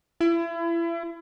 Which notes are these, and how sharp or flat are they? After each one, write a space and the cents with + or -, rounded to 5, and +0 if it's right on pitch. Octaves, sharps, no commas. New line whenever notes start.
E4 +35